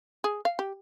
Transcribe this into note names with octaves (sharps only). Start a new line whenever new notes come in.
G#4
F5
G4